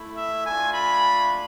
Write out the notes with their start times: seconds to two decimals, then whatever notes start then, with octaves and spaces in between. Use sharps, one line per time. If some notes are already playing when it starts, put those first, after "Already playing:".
Already playing: A3 E4
0.17 E5
0.46 A3 D4 F4 G#5
0.73 B5